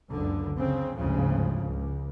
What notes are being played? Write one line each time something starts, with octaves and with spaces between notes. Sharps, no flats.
F#1 C#2 D3
C#3 C4
G1 D2 G#2 C#3 F3
C#2